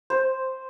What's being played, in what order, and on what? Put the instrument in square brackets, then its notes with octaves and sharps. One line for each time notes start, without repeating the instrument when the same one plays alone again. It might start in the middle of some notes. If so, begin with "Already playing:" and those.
[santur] C5